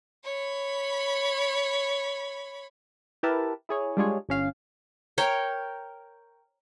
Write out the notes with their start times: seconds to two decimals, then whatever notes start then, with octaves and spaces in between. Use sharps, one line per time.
0.24 C#5 B5
3.23 E4 G4 A#4 B4 E5 A5
3.69 E4 G#4 C#5
3.97 G3 G#3 D4 F4 G#4 C#5
4.29 G1 C#4 F5
5.18 A#4 C#5 G5